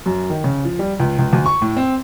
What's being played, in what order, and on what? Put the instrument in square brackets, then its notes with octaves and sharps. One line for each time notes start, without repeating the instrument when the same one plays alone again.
[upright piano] F#2
D#3
C#3
F3
G3
C#2
C#2
D2
C#6
A2
C4